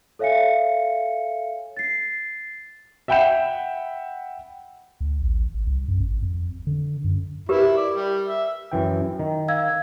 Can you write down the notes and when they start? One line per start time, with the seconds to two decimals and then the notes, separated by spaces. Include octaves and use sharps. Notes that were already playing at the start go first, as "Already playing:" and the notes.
0.19 A4 C#5 E5 F5 G#5 C#7
1.77 A6 C7
3.08 E5 F#5 G5 B5 G6 E7
5.01 D2
5.22 A1
5.54 G#1
5.67 C2
5.88 F#2
6.00 G#1
6.22 F2
6.67 D3
7.04 F#2
7.49 E4 G4 A#4 B4
7.77 D5
7.93 G3
8.27 E5
8.72 F#2 E3 G5
9.19 D#3
9.48 F5 E6 G#6